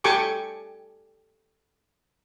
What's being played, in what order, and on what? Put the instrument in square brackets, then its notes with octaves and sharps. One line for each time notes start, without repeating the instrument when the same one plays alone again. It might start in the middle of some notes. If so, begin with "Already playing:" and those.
[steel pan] G4 A4 G5 G#5 C#6 D6